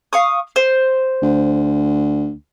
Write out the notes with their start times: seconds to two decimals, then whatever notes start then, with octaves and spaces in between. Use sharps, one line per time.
0.13 F5 C#6 D#6
0.56 C5
1.22 D2